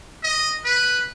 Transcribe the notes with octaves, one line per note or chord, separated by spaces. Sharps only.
D#5
B4